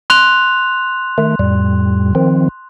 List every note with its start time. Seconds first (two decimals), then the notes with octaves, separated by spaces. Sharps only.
0.10 C6 F#6 F7
1.18 D#3 A3
1.39 F2 A2 G3
2.15 D#3 F3 C4